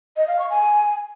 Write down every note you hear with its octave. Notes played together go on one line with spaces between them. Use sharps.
D#5
F5
C#6
G#5